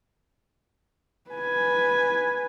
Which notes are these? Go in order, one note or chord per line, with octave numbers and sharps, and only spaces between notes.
B4 G#5